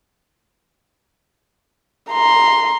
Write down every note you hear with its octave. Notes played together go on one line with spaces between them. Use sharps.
A#5 C6